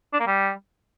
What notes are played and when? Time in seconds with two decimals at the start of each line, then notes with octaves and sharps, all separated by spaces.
0.13 D4
0.20 A#3
0.27 G3